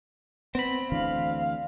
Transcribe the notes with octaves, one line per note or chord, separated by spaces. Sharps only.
B3 C4 B5
D2 E3 D4 F5